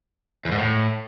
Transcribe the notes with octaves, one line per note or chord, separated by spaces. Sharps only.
E2
G#2
A2